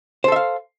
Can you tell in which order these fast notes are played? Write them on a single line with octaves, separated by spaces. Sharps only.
C5 A4 E5 F5